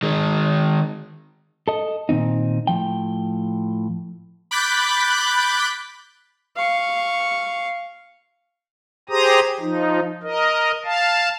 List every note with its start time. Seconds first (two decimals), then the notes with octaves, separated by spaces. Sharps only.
0.03 D#3 G#3
1.68 A4 D#5
2.09 A#2 D#3 C4 D#4
2.67 A2 F3 G5
4.51 B5 D6 F#6 G6 A6 B6
6.56 F5 C#6
9.09 G4 G#4 C5 A#5 D#6
9.60 F3 D#4
10.23 A#4 D#5
10.85 F5 A5